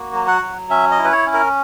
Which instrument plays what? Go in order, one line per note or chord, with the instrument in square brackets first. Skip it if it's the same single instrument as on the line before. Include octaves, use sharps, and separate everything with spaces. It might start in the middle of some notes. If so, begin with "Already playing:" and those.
Already playing: [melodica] A#3 F#4
F#3
F#5
F#3
C#4 E5
D#5
E4
B4
C#5
C#4
A#4